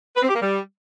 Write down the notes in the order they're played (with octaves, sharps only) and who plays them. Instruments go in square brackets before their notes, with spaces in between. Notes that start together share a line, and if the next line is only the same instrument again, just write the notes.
[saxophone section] B4
C4
G4
A#3
G3